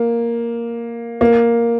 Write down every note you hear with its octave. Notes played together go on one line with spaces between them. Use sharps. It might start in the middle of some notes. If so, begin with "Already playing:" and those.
Already playing: A#3
A#3